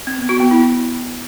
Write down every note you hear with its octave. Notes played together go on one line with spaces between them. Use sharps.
C4
B3
F#4
B3
E4